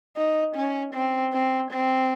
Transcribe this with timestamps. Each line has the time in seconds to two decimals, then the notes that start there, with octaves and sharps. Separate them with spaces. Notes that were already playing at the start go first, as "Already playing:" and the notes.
0.17 D#4
0.55 C#4
0.94 C4
1.33 C4
1.71 C4